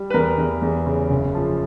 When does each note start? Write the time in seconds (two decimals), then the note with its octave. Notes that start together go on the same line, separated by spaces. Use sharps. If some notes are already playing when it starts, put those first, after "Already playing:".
Already playing: G3
0.10 B4
0.14 E2 A#4
0.38 E2
0.62 E2
0.86 C#3
1.10 F#1
1.34 F3